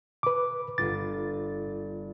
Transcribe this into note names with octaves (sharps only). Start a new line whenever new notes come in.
B4 D6
G1 F4 D6 A6